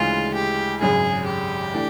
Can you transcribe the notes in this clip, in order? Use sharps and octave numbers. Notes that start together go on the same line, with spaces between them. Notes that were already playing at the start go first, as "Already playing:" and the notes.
Already playing: D2 C#3 E3 G#3 F4
G4
G#1 F#2 C#3 G#4
G4
E3 A3 D4